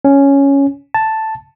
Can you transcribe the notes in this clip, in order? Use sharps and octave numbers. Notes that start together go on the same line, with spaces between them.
C#4
A5